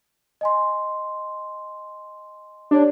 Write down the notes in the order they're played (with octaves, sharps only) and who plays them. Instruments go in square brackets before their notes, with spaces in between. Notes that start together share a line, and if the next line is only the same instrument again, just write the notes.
[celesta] D#5 G#5 C6
[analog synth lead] D4 [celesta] G4 C#5 D5